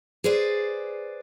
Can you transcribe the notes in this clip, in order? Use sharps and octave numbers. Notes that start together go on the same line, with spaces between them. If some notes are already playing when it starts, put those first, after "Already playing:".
G#4 B4 C5 D5